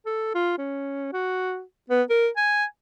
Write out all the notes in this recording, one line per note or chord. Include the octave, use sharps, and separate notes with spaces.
A4
F4
C#4
F#4
B3
A#4
G#5